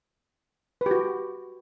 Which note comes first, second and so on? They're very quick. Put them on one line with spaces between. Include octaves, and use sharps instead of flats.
B4 G4 F#4